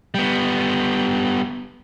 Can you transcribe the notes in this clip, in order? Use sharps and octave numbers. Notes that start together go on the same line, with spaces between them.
G3 B3